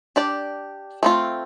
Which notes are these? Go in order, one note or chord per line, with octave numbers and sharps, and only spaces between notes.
D4 G4 D5
A3 C4 F4